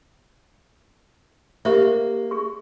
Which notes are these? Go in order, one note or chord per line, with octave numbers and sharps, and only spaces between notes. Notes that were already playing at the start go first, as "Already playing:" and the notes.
A#3 G4 C5 E5
G#4 C#6